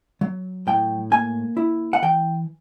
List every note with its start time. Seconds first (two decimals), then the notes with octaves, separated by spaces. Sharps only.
0.21 F#3
0.67 A2 G5
1.11 A#3 G#5
1.57 E4
1.93 F#5
2.02 E3 G5